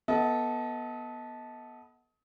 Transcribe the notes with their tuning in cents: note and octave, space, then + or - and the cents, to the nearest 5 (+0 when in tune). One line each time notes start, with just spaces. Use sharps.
B3 -15 A4 -10 D#5 +30